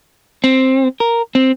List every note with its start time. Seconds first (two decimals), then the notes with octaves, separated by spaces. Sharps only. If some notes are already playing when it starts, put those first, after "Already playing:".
0.44 C4
1.00 A#4
1.35 C4